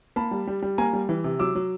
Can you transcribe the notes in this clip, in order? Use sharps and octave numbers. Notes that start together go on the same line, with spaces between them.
A#3 A5 B5
G3
G3
G3
A#3 G#5 A#5
G3
E3
C3
F#3 D6 E6
F#3